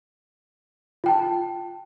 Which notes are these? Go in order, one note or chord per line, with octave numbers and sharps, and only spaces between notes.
F4 G5 A5